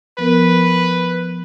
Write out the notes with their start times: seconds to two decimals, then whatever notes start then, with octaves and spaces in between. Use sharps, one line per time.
0.19 F3 B3 A#4 B4